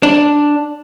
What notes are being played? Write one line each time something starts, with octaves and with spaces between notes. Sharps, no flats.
D4